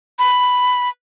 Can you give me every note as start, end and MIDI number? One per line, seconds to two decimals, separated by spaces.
0.19 0.89 83